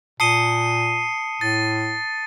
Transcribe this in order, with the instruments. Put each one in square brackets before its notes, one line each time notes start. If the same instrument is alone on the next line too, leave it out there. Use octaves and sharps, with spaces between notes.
[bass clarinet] A#2 [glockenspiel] A5 D#6 G7 [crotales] C7 C#7 D#7
[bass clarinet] A2 [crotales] A6